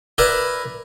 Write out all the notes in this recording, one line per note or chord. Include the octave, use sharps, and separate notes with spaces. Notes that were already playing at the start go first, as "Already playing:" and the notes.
E4 A#4 B4 D5 E5